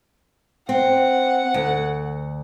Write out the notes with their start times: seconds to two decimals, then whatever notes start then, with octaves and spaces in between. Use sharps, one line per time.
0.69 C4 F#5
1.54 D2